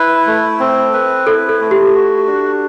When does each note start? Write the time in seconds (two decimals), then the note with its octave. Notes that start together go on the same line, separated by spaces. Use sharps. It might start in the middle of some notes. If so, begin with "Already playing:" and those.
Already playing: E4 B4
0.27 A3
0.60 C4
0.93 B4
1.27 E4 A4
1.49 A4
1.61 A3
1.71 G4
1.94 F#4
2.27 D4